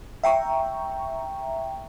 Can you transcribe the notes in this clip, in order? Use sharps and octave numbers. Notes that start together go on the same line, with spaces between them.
E5 G5 A#5 C#6